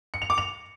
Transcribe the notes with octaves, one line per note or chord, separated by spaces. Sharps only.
C#7
F7
D6
F7